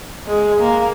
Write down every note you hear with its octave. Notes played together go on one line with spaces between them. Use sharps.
G#3
A#3